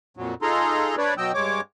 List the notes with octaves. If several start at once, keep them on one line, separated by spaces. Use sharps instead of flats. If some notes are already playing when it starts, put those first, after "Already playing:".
F2 A#2 F#3
D#4 F4 G#4 A4 A#5 C6
D4 B4 C#5 D5
B2 F#3 D#5 G5 E6
G2 G#3 C#5 D6